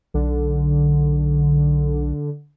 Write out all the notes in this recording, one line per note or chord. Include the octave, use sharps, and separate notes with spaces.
B1 D3